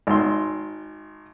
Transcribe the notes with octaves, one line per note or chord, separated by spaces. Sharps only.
G#1 C6